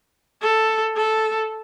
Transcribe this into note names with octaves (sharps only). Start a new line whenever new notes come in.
A4
A4